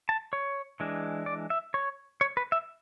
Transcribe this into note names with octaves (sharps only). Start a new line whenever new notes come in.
A5
C#5
E3 G#3 D4
D5
E5
C#5
C#5
B4
E5